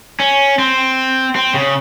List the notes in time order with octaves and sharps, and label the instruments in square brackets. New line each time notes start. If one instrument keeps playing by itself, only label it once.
[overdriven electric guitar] C#4
C4
C4
C#3